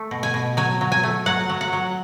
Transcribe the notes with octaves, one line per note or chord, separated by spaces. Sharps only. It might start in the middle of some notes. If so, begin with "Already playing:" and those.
Already playing: A3
B2
G#5
B2
F#3 G#5
F#3
G#5
A3
F#3 F#5
F#3
F#5
F#3